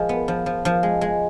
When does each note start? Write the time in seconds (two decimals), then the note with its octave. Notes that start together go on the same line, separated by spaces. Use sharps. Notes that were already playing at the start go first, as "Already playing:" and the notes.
Already playing: F3 G#3
0.09 B3
0.28 F3
0.46 F3
0.65 F3
0.83 G#3
1.01 G#3